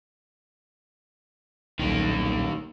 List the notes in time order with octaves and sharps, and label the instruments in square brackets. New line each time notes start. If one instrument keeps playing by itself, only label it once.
[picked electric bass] D#1 B1 [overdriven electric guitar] D#3 A#3